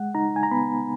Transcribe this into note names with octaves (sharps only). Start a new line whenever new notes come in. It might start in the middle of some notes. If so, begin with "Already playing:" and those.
Already playing: G#3 F#5
D#4 A#5
G#5
A#5
B3 B5